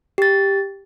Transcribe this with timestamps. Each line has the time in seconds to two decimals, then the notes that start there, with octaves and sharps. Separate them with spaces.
0.18 G4 A6